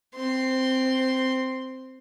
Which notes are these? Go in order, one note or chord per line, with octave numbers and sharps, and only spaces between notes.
C4 C6